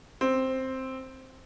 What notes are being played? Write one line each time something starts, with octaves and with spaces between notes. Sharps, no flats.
C4